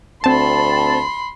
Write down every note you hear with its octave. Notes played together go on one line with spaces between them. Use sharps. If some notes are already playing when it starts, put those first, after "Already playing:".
D2 C4 A5 B5 C6